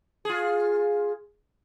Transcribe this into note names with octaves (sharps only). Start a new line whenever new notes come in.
F4 G#4